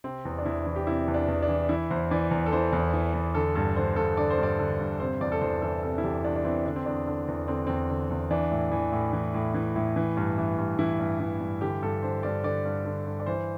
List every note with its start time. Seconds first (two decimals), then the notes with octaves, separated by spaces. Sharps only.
0.04 C3 C4
0.25 E2
0.38 D4
0.45 E2 E4
0.66 E3
0.76 G4
0.87 C3 E4
1.08 E2
1.14 D4
1.28 E2
1.43 D4
1.49 E3
1.69 E3 E4
1.90 E2 C5
2.11 E3 D5
2.31 E2
2.46 A4
2.52 E3 C5
2.72 E2
2.93 E3
3.14 E2
3.35 D3 A4
3.55 G2 A4
3.76 D3 C5
3.96 G2 A4
4.17 D3 D5
4.30 C5
4.38 G2
4.43 D5
4.59 D3
4.79 G2
5.00 C3 C5
5.21 E2 D5
5.32 A4
5.41 E2 C5
5.62 E3 A4
5.82 C3 A4
5.98 E4
6.03 E2 G4
6.24 E2 D4
6.36 D4
6.44 E3 C4
6.65 D3 D4
6.76 C4
6.86 E2 D4
7.07 D3
7.28 E2
7.48 D3 C4
7.67 E2 C4
7.90 D3
8.10 E2
8.31 E3 D4
8.52 A2
8.72 E3
8.92 A2
9.13 E3
9.34 A2
9.54 E3
9.76 A2
9.96 E3
10.17 G2
10.38 E3
10.58 G2
10.79 E3 E4
10.99 G2
11.20 E3
11.40 G2
11.61 D3 G4
11.82 G2 A4
12.03 D3 C5
12.23 G2 D5
12.44 D3 D5
12.65 G2
12.85 D3
13.06 G2
13.20 D5
13.26 E3 C5